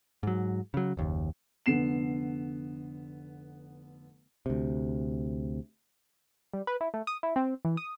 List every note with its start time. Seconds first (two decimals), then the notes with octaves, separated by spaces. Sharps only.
0.23 G#2 F#3
0.74 C#3 F#3
0.97 F#1 D#2
1.66 F1 D3 B3 C7 E7
4.46 D2 C3
6.53 G3
6.67 B4
6.81 E4
6.94 A3
7.07 D#6
7.23 E4
7.36 C4
7.65 E3
7.77 D#6